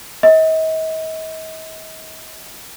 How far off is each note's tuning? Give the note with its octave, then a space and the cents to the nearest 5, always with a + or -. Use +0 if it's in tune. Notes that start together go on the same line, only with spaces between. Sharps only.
D#5 +40